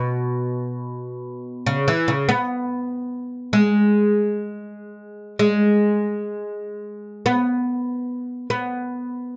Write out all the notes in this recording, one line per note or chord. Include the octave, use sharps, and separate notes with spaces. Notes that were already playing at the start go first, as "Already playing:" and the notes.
Already playing: B2
C#3
E3
C#3
B3
G#3
G#3
B3
B3